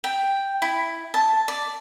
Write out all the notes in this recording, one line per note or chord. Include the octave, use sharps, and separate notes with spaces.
G5
E4
A5
D5